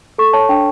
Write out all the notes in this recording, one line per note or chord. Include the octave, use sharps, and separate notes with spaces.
A4 C#6
C#5 A5
D4 G5